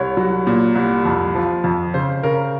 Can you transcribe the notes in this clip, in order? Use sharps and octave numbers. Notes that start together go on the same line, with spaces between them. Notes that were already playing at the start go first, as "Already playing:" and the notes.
Already playing: C2 C#5
F#3
A#2
C2
F2
F3
F2
C#3 C5
C#3 A#4